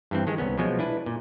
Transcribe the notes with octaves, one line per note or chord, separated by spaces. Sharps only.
G2 E3 C4
D#3 G#3
C2 B3 C#4
B2 F3 F#3 G#3
D4 E4 B4
A#2